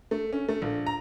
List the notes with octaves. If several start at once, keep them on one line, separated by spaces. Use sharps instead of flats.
A3
C#4
A3
A#1
A#5